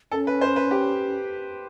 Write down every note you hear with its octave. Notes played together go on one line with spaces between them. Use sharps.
C#4 A4
B4
C5
B4
G4